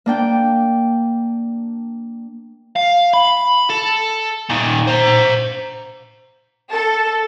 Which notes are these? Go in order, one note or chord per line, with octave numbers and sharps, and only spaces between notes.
A#3 D4 G5
F5
B5
A4
A#2 D#3
C5 A#5
A4